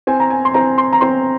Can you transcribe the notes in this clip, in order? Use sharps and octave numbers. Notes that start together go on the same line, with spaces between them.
C4 G#5
A#5
G#5
C6
C4 A#5
C6
A#5
C4 C6